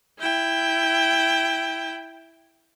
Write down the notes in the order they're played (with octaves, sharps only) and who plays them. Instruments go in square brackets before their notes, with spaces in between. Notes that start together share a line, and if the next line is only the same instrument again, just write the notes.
[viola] E4 G5